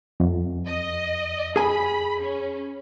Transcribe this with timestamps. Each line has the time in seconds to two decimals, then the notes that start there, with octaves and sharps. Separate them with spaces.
0.20 F2
0.67 D#5
1.56 G#4 G#5 B5
2.22 C#4